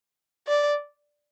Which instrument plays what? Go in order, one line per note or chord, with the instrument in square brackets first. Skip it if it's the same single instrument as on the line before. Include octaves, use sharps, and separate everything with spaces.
[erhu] D5